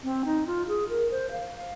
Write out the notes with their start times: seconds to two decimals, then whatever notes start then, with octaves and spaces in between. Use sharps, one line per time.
0.04 C4
0.25 D#4
0.47 F4
0.68 G#4
0.89 A#4
1.11 C5
1.32 F5